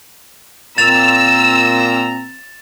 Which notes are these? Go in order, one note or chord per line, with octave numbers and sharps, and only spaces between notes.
A#2 C4 A#5 E6 A6 E7 F7